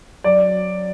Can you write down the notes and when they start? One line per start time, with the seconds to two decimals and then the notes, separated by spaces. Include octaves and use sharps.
0.24 F#3 D5